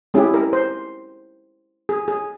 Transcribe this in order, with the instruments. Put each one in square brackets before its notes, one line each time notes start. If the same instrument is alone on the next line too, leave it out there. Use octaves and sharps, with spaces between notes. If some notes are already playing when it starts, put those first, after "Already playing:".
[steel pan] G#3 C#4 E4 G4 G#4
A#4
C5
G#4
G#4